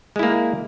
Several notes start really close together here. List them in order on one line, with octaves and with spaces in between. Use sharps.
G#3 E4 A#3